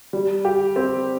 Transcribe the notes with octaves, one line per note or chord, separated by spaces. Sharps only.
G3
G4
C4